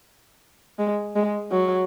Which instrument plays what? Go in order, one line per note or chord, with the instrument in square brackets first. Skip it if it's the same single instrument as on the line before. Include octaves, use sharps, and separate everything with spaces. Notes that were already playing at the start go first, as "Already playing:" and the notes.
[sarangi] G#3
G#3
F#3